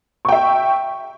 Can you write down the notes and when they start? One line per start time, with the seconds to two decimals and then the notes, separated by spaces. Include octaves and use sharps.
0.25 C#6
0.29 G5
0.32 E5